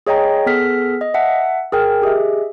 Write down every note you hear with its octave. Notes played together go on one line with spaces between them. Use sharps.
G#4 C#5 D#5 G5 A#5
B3 G#4 A4 F6 B6
D#5
E5 F#5 A5
G#4 A#4 G5 F6
G4 G#4 D#5 E5